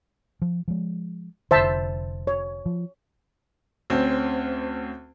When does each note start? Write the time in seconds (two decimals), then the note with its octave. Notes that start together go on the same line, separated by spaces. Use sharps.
0.42 F3
0.68 F3 G#3
1.51 F1 D3 C5 E5 A5
2.27 C#5
2.66 F3
3.90 D2 C4 C#4